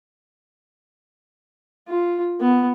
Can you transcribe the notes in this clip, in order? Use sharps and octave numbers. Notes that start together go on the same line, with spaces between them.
F4
B3